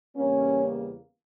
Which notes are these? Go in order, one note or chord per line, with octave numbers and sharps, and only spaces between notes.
E2 C#3 G3 A#3 C#4